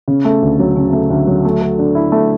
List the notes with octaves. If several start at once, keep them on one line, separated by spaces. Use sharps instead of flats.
C#3
A3
D2
F#3
C#3
A3
D2
F#3
A3
A4
D3
E4
A3